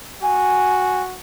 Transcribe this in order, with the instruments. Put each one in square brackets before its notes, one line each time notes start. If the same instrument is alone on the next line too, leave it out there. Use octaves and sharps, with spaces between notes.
[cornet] F#4 [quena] G#5